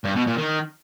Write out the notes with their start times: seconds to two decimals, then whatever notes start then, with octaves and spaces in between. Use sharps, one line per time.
0.04 G2
0.15 B2
0.27 A#2
0.38 D#3